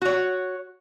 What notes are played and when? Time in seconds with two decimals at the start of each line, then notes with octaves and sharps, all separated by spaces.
0.02 F#4 C#5